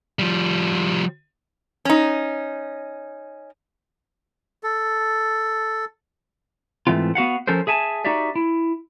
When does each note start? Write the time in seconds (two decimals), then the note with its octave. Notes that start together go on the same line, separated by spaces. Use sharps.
0.19 F3 G3
1.85 C#4 D#4
4.63 A4
6.87 G#2 E3 A3 C4 F4
7.15 B3 F#4 F5 F#5
7.47 F3 C#4 A4 A#4 C5
7.67 G#4 E5 G#5 A5
8.05 D#4 F#4 G4 D5 E5
8.35 E4